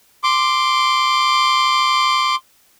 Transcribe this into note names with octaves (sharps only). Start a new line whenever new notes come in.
C6 D6